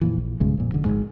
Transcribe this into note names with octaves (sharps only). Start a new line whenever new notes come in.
F2 A#2 E3
A#1
B1 G2 C#3 G#3
F2 A#2
E1 D3
G#1 F2 G#2 G#3